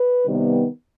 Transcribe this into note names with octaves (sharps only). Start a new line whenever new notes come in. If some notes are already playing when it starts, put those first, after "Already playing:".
Already playing: B4
C3 D#3 G3 B3